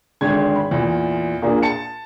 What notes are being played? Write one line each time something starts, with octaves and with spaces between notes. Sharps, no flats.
G#1 D3 G#3 G#6
B5
E2 A#2
A#2 A#3 D4 G#4
A5 C#7